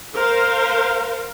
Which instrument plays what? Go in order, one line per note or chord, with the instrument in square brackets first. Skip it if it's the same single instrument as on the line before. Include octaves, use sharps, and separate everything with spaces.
[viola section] A#4 C5 F5